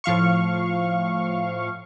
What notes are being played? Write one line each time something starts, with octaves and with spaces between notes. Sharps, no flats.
A2 F3 F5 C#6